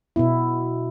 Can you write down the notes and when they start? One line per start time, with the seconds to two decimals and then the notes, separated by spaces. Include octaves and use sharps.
0.16 B2 B3 E4